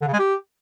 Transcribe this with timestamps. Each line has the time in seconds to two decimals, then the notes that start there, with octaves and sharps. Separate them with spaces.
0.02 D3
0.08 C#3
0.13 G#3
0.19 G4